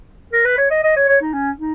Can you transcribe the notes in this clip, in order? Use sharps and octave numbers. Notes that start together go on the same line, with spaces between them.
A#4
B4
C#5
D#5
D#5
C#5
C#5
D#4
C#4
D#4